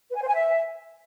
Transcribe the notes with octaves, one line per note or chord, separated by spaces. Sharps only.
B4
G#5
C5
G#5
E5